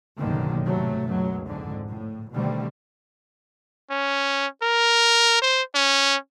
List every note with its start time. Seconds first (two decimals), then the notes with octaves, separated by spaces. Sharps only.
0.18 F#1 B1 G2 D3 D#3 A#3
0.65 G#2 C3 F#3 A3
1.06 C#2 F#2 B2 F#3
1.48 F2 G#2 D3
1.88 A2
2.32 B2 D3 D#3 G3 A3 C4
3.90 C#4
4.62 A#4
5.42 C5
5.75 C#4